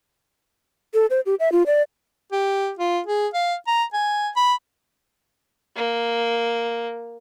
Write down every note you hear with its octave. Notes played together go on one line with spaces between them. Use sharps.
A4
C5
G4
E5
F4
D5
G4
F4
G#4
F5
A#5
G#5
B5
A#3